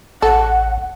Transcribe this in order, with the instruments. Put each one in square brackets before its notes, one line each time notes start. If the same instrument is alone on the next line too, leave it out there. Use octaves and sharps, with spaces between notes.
[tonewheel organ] A1 [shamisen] A4 [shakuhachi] F#5